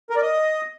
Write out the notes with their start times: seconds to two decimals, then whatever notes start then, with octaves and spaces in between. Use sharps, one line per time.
0.10 A#4
0.16 D5
0.22 D#5